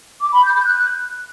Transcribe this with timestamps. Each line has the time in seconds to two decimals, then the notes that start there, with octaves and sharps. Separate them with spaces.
0.21 D6
0.32 B5
0.44 G6
0.55 G6
0.66 F#6